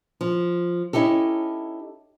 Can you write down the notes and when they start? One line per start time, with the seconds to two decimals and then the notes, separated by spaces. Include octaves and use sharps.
0.21 F3
0.93 C#4 D#4 E4 G4 A4